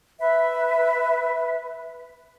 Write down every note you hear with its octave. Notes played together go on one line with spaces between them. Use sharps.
B4 E5